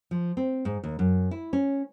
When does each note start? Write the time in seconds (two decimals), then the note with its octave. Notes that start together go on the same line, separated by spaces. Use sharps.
0.11 F3
0.37 C4
0.65 G#2
0.84 D#2
0.99 F#2
1.31 E4
1.53 C#4